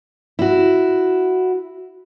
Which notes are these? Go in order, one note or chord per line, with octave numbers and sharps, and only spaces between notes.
E4 F#4